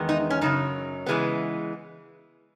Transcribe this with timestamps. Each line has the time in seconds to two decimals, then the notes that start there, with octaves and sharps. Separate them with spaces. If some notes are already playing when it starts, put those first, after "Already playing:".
Already playing: E2 D#3 G#3 B3
0.09 D#4
0.30 C#4
0.41 F#2 C#3 F#3 D#4
1.06 C#3 E3 G#3 B3